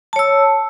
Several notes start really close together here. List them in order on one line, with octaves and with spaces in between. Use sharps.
A5 C#5 E6